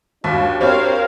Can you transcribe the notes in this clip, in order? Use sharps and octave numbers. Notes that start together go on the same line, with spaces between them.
D#2 G3 D4 F4 F#4 B4
C4 G4 A#4 C5 C#5 F5